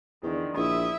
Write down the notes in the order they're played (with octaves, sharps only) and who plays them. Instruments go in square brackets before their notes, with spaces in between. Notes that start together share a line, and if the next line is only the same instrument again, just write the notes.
[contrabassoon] E2 [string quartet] D3 D#3
[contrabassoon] A#1 [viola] E4 E5 [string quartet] D#6